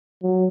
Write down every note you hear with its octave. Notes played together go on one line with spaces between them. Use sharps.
F#3